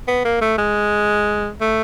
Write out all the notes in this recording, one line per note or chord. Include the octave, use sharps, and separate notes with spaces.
B3
A#3
A3
G#3
A3